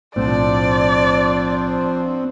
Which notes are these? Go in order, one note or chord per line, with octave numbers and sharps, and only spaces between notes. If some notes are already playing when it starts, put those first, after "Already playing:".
B1 A2 F3 C4 D4 C5 D5